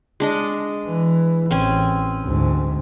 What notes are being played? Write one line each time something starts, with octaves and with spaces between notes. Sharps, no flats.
G#3 D4 D#5
E3
A1 C4 C#4 G#5
D2 G#2